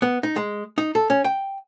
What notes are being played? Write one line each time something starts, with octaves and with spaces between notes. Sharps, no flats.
B3
D#4
G#3
D#4
A4
C#4
G5